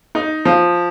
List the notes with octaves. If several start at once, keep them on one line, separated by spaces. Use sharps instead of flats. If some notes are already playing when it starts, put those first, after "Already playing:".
D#4
F3